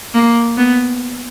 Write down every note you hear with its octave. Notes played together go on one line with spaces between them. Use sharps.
A#3
B3